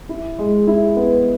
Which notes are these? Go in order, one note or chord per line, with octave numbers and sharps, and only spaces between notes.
E4
G#3
E4
B3